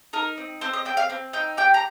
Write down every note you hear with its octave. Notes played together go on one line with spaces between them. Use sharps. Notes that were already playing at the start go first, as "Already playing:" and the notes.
D#4 A#4
C4
C4 C5
D#5
C4 G5
F5
C4
D#4 G5
G4 G5
A#5